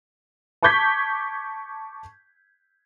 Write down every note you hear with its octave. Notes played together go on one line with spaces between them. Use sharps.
A5 C#6 D6 G6 G#6 B6